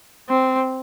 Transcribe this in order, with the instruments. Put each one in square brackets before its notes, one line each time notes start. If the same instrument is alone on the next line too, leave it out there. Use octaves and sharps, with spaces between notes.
[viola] C4